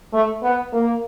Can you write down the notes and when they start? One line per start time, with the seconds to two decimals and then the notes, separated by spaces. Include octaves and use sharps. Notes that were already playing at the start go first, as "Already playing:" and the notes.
0.13 A3
0.43 B3
0.73 A#3